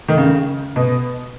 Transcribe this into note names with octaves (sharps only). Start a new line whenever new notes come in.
D#3
C#3
B2